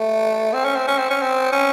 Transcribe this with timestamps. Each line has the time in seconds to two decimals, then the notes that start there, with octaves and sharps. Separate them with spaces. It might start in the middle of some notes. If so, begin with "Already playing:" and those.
Already playing: A3
0.54 C4
0.64 C#4
0.76 C4
0.87 C#4
0.98 C4
1.10 C#4
1.21 C4
1.52 C#4